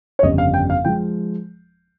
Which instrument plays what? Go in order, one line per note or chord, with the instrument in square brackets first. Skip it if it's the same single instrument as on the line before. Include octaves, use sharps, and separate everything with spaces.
[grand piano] C#5
G1 F2 C#3 G3 D#5
F5
G5
F5
F3 G#3 G5